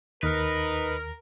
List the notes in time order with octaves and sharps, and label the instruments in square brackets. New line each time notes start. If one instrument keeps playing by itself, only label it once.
[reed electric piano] D#2 [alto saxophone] D#4 [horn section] A#4 [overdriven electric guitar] B4